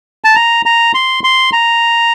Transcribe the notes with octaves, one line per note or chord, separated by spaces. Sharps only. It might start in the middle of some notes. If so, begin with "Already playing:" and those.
A5
A#5
A#5
C6
C6
A#5